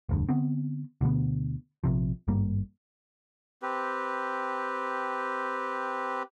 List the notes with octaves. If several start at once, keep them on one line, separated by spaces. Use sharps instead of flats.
F1 D2 G2
D3 B3 C4
D2 B2 D3 B3
A#1 C3 F3
G#1 G2 G3 A#3
C4 G4 B4